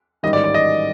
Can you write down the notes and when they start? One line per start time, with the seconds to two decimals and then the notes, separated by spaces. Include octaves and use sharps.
0.23 A1 G#2 D#3 G3 D#5
0.33 D5
0.44 D5
0.54 D#5